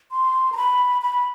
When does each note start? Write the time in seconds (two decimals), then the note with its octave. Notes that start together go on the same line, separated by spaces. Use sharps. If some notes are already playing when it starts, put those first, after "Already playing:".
0.11 C6
0.52 A#5
0.57 B5
1.02 B5